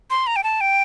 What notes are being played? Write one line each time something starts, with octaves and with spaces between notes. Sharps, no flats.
C6
A#5
G5
A5
G5